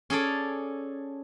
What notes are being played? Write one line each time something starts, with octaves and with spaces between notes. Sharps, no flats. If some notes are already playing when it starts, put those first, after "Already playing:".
C#4 G#4 A4 D5